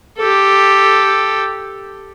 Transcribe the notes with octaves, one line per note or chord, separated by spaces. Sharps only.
G4 A4